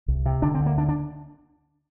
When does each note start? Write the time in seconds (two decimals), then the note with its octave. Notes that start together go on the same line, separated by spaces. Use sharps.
0.08 C2
0.26 C3
0.42 D3 D4
0.54 C4
0.60 D2
0.66 A#3
0.77 D3 D4
0.89 D4